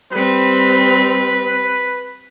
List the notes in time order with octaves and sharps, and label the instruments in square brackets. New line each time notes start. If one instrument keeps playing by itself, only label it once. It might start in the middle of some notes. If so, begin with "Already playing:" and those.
[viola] G3 C4 [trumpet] B4